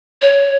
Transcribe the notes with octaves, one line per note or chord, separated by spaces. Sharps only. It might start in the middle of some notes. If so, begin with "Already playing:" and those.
C#5